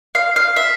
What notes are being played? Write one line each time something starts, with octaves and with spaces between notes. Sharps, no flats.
F5
F5
E5